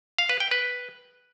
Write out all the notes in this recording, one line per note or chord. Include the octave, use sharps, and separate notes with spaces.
F5
B4
G5
B4